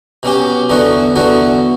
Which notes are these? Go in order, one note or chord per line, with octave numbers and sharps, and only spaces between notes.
B2 F#3 C#4 G4
E2 D3 F#3 B3 F#4
E2 D3 F#3 B3 F#4